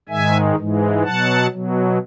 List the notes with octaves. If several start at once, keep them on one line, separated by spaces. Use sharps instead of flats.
G#2 D#3 G#3 E5 G#5
G#2 E3 G#3
B2 F#3 F#5 A5
B2 F#3